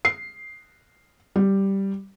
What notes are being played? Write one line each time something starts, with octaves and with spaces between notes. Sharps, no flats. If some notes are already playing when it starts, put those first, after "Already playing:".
C7
G3